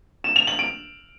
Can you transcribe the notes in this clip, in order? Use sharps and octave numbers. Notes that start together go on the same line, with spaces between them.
E7
F7
F#7
D7